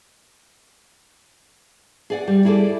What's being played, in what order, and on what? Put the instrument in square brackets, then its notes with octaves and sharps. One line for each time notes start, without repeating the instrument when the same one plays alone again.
[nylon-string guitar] G#4 D5 F#5
G3
E4 G#4 A4 D5